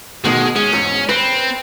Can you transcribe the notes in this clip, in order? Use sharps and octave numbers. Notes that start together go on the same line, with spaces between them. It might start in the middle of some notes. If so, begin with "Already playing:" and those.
D2 B2 D#3 G#3
G#3 C#4
E2 G#2
C4 B4